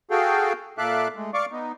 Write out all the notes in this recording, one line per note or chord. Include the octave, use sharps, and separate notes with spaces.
F#4 G#4 A4 F5 G5
A#2 A4 E5 F5 D6 F#6
G#3 A3
D5 F5 C#6 D6
B3 D#4